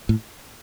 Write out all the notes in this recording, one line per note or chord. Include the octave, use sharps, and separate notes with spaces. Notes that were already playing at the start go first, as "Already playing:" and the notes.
A2